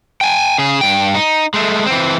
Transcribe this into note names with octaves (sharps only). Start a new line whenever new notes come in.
G5 G#5
C#3 G#4
G2 G5
D#4
G#3 A3
E3 C4